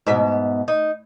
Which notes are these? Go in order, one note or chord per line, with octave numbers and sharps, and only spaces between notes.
G#2 B2 E5
D#4